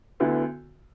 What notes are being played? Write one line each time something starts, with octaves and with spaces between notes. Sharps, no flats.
D2 D3 B3 E4